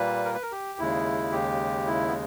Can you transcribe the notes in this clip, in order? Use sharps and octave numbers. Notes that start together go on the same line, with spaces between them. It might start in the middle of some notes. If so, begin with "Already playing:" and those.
Already playing: A#2 G3 A#3 B4
A#4
B4
A#4
G4
D#2 C#3 G#3 E4
G4
E4
B3